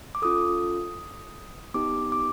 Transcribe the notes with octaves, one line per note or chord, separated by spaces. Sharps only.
D6
C#4 F4 A4 D#6
B3 D#4 G4 D6
D6